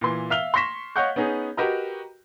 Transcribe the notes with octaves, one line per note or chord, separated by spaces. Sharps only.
A#2 E3 C6
E5 F5 F6 F7 G7
C6 C#6 A#6 B6 E7
C#5 D#5 F5 F#5 C#6 G6
B3 C#4 D#4 G#4
F#4 G4 A#4 B4 D#5 A#5